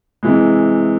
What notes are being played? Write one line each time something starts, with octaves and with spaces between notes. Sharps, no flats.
C3 E3 G#3